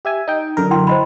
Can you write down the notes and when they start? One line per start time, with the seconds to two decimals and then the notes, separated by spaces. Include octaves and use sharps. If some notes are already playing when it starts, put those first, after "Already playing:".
0.05 G4 E5 G#5
0.27 D#4 G5
0.57 F#2 D3 A#4
0.71 E4 G5 C6
0.87 C5 D#5 B5